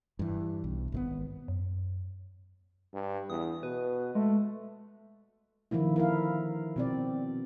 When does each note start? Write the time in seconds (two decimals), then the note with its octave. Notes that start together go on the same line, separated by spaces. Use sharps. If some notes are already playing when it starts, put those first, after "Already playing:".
0.19 G2 E3
0.64 B1
0.92 G#1 C#3 B3
1.48 F#2
2.94 G2
3.30 E2 D#6
3.63 B2 B4
4.15 G#3 A3
5.71 D3 D#3 F3 A#3 E4
5.96 E4 A#4 F5
6.76 B2 C4 D5